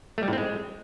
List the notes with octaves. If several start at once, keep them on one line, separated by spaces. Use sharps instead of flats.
A3
G3
A2
C4
G#3